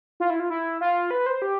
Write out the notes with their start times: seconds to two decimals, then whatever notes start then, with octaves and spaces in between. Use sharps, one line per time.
0.20 F4
0.30 E4
0.40 F4
0.50 E4
0.81 F4
1.11 B4
1.26 C5
1.42 G4